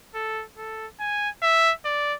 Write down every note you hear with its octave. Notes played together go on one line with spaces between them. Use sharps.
A4
A4
G#5
E5
D5